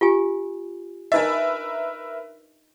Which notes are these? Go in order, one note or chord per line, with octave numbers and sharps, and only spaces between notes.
F4 G4 G#5
D4 D#4 A#4 B4 D#5 E5